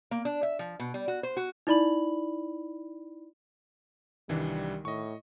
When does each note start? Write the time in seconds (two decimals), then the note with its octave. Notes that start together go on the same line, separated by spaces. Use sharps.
0.11 A#3
0.25 D4
0.43 E5
0.59 F3
0.80 B2
0.94 G3
1.08 F#4
1.23 C5
1.37 F#4
1.67 D#4 E4 D5 B5 F#7
4.29 C2 D#3 E3 G3 D4
4.85 A2 D#5 C#6